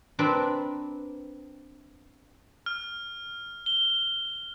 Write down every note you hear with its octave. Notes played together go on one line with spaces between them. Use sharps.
C4 D4 A#4 B4 D5
F6
G7